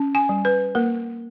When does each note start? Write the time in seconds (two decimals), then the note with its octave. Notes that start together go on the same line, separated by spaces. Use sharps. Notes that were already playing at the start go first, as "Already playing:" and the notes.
Already playing: C#4
0.15 G#5
0.29 G3
0.45 B4
0.75 A#3 A#4